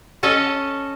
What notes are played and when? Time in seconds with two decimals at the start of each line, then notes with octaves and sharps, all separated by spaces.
0.23 C#4 A4 C#5 D#5